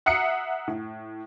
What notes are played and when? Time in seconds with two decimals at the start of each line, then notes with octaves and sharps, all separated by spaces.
0.06 E5 F#5 A#5 D#6 C7 C#7
0.68 A2